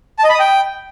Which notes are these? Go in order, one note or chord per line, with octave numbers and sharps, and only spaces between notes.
A5
D#5
B5
D#6
G5